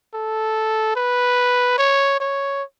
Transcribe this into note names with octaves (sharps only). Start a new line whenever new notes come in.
A4
B4
C#5
C#5